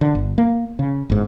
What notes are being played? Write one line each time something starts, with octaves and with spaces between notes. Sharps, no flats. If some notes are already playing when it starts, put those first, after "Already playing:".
D3
G1
A#3
C#3
G1 G#2